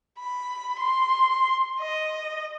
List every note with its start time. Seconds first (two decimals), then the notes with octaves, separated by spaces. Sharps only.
0.19 B5
0.80 C6
1.80 D#5